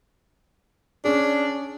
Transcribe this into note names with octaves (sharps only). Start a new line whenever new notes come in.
C#4 D4 G#4